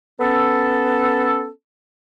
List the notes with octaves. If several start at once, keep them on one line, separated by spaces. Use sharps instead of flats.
B3 C#4 A4